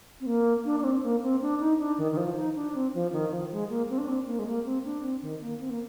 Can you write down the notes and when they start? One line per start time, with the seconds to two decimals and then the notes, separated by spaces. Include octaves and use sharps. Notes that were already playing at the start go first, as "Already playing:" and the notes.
0.20 C4
0.26 A#3
0.65 D4
0.80 D4
0.84 C4
1.03 A#3
1.23 C4
1.41 D4
1.60 D#4
1.79 D4
1.98 D#3
2.12 D#3
2.17 F3
2.36 D#4
2.55 D4
2.74 C4
2.94 F3
3.12 D#3
3.31 F3
3.51 G#3
3.69 A#3
3.89 C4
3.98 D4
4.08 C4
4.27 A#3
4.39 G#3
4.47 A#3
4.65 C4
4.85 D4
5.02 C4
5.22 D#3
5.41 A#3
5.60 C4
5.70 A#3